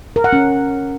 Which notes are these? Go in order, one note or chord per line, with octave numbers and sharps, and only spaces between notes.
A#4
F#5
C#4